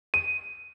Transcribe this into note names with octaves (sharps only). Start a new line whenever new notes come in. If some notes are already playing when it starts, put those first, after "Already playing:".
D#7